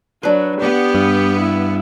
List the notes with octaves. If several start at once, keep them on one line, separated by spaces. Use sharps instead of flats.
F#3 D4 B4
B3 G4
G2
E4